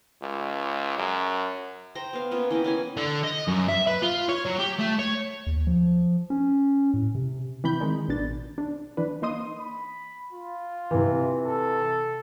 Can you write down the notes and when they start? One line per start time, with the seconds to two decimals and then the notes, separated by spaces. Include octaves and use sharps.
0.22 C#2
0.98 F#2
1.95 C5 G5 A#5
2.13 B3 F5
2.31 A#3 B3 C#4 F4
2.51 E3 D#5 G5
2.64 E3 C#4 G#5
2.97 D3
3.23 D#5
3.48 F#2
3.68 E5
3.87 B4
4.02 F4
4.29 C#5
4.45 F#3
4.58 G4
4.79 A3
4.99 C#5
5.47 D#2
5.67 F3
6.30 C#4
6.94 A2
7.15 C3
7.64 E3 C4 B5 G6
7.80 D#3 G#3 D#4
8.08 A1 B2 D4 A6
8.58 D4
8.97 E3 D4 B4
9.22 A#3 D#4 C6 D#6 D#7
9.60 B5
10.33 F4
10.91 C3 E3
11.45 A4